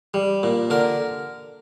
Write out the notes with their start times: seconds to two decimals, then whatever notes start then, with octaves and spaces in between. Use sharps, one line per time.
0.14 G3
0.43 A#2
0.70 D3 A#4